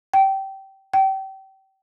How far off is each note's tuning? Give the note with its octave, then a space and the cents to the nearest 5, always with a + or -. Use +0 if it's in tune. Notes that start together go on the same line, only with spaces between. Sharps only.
G5 -20
G5 -30